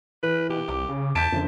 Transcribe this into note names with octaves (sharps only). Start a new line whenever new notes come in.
E3 B4
B2 G4
C2 D6
C#3
E2 A5 G6 B6 D7
F#1 F2 D3